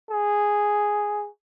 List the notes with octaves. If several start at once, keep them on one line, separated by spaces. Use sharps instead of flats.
G#4